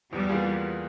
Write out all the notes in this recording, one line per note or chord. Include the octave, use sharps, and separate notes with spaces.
E2 G3
E3 A#3 F4 G#4